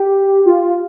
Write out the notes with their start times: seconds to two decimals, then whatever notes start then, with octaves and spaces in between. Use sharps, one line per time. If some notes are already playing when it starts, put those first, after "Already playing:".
Already playing: G4
0.46 F4